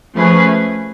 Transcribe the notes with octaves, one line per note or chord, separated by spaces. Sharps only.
F3 A3 C#4 G#4 B4